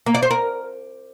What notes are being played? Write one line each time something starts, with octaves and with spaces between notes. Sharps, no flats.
A#3
D5
C5
A#4